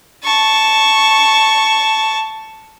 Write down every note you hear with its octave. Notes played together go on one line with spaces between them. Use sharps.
A5 C#6